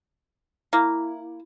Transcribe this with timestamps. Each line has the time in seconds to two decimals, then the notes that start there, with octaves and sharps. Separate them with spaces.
0.73 A#3 E4